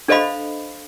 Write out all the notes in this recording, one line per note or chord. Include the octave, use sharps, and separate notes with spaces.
D4 A4 C5 D#5 F5 B5